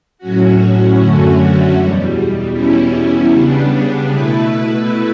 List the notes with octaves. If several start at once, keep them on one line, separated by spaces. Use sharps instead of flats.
A2 F#3 C#4 F#4
F#2 D3 A3 C#4 F#4
E2 B2 G3
E2 B2 G3 C#4 E4
C#3 G3 B3 D4
B2 A3 E4 B4